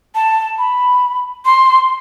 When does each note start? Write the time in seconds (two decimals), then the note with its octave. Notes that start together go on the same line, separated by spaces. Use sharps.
0.15 A5
0.58 B5
1.45 C6